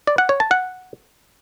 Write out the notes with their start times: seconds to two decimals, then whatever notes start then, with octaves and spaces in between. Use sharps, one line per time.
0.07 D5
0.18 F#5
0.29 C#5
0.40 A5
0.51 F#5